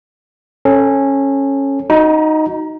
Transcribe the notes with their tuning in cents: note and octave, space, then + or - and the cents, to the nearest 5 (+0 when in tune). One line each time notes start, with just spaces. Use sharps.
C#4 -15 A4 +0
D#4 +0 F#4 +0 A#5 +45